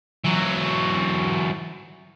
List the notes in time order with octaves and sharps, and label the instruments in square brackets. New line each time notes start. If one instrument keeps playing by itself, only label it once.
[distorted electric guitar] E3 F#3